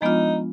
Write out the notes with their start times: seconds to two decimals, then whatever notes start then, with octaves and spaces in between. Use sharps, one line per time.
0.02 F3 G#3 B3 D4 D#4 F4